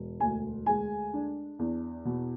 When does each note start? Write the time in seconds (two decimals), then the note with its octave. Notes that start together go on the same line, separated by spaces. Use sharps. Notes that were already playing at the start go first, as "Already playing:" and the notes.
Already playing: E1
0.20 D2 G#5
0.66 G#3 G#5
1.14 D4
1.59 E2
2.05 B2